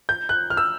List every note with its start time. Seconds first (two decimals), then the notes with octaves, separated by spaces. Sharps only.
0.09 G6
0.29 F#6
0.50 F6
0.57 E6